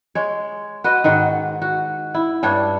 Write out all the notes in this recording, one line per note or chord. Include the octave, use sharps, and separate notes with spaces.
G#3 C#5
F#4 B4 D#5
G#2 D#3 F#4
F#4
E4
G2 G3 D4 C#5